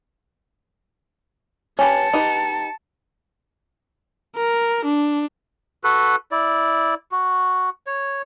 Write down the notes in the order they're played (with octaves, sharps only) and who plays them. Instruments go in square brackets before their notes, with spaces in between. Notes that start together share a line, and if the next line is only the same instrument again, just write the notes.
[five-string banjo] C#4 G4 B4 [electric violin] A5 C#7
[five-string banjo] D#4 G4 B4
[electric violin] A#4
D4
[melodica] F#4 A4 B4
E4 D5
F#4
C#5